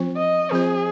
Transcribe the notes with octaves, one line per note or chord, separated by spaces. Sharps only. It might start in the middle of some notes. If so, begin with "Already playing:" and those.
Already playing: F3 C4 F4 C5
D#5
F3 C4 F4 G#4 C5